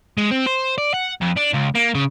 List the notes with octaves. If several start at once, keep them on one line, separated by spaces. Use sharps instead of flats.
G#3
C4
C5
D5
F#5
F2
D4
C#2
A#3
C#3